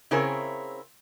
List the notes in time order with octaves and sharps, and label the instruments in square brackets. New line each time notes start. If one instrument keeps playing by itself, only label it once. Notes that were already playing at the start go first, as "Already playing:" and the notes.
[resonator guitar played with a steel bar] C#3 C4 E4 G#4 A#4 C#5